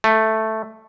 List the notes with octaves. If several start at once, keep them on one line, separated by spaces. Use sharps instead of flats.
A3